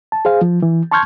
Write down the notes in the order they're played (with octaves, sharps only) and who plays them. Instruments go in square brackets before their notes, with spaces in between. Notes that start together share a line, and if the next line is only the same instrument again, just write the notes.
[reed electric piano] A5
G#4 C5 F5
F3
E3
A5 C6 C#6 F6 G6 G#6